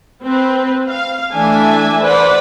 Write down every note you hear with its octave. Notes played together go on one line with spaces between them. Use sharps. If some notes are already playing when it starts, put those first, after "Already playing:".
C4 B4
F5
E3 A3 D4 E5 G#5 A5
B4 C5 D5 F#5